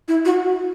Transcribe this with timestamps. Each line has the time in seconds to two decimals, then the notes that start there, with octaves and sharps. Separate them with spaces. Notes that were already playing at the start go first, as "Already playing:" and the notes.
0.08 E4
0.25 F#4